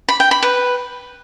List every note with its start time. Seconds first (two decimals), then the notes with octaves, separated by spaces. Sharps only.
0.09 B5
0.20 G5
0.31 B5
0.43 B4